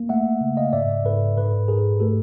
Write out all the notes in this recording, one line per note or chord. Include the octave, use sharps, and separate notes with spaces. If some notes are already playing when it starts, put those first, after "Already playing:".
Already playing: A#3
A3 E5 F#5
C#3
D#5 F5
G#2 D5 E5
G#2 A4 B4
G#2 A4 B4
G#2 G#4 A#4
A3 G4 A4